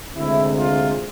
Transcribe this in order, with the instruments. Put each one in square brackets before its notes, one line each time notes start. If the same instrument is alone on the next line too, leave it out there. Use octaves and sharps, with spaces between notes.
[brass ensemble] D2 C3 G#3 E4
F4